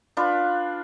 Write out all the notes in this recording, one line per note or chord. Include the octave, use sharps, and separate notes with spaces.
D4 F4 B4